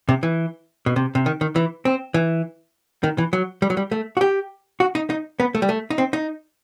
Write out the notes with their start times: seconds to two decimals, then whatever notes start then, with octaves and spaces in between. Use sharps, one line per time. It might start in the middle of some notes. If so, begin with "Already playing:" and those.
0.09 C3
0.23 E3
0.86 B2
0.96 C3
1.15 C3
1.26 D#3
1.41 D#3
1.56 E3
1.85 C4
2.14 E3
3.03 D#3
3.18 E3
3.33 F#3
3.62 G3
3.70 F#3
3.77 G3
3.92 A3
4.17 F#4
4.21 G4
4.80 F#4
4.95 D#4
5.10 D#4
5.40 B3
5.55 A3
5.62 G3
5.69 A3
5.90 D#4
5.98 C4
6.13 D#4